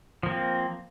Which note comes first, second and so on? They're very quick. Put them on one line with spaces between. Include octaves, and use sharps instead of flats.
F3 A#3 C4